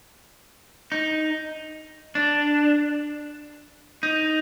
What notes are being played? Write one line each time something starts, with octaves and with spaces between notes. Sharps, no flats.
D#4
D4
D#4